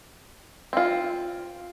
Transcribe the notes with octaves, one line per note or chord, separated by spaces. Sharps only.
C4 F4